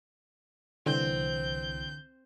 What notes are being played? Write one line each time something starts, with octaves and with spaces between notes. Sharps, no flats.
C2 D3 E3 C4 G6